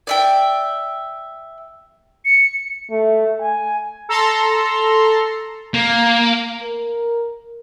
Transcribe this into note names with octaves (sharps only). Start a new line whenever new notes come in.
D5 E5 G5
C#7
A3
G#5
A4 A#5 C6
A#3
A#4